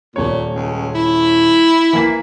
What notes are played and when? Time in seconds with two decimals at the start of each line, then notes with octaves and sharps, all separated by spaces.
0.16 D#1 A#2 C#5
0.54 C#2
0.95 E4
1.93 E3 A#3 B6